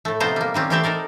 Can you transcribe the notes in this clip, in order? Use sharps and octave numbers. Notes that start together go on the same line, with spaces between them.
A2 A3
C3 F3 B3 D#4 C5 A5
G3 A#3
D#3 G3 C4 C#4
E3 A3 C4 G4 C5 E5
D#4 A4 A#4 D5